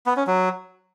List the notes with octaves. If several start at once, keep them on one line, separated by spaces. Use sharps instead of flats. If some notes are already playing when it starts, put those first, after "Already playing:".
B3
C#4
F#3